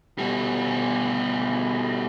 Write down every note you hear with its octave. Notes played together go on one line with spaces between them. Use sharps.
B2 G3